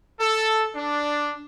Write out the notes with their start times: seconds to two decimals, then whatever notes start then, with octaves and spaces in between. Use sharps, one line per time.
0.20 A4
0.75 D4